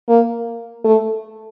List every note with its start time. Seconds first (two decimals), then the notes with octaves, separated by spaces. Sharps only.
0.08 A#3
0.85 A3